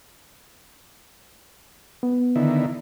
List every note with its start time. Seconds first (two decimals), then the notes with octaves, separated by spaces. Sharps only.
2.03 B3
2.36 D3 D#3 E4